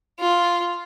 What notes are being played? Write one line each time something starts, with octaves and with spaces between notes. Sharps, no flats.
F4